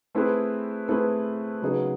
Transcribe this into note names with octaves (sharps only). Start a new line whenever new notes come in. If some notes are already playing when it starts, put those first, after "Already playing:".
A3 C4 E4 G#4 B4
A3 C4 E4 G#4 B4
C#3 F#3 B3 D#4 G#4